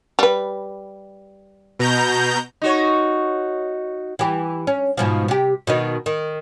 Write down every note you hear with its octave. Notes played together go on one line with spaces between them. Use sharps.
G3 B4
B2 A#5 G6
D#4 F#4 C#5
E3 G4
C#4
G#2 B2 F3
C3 G4
B2 D#3 D#4
D#3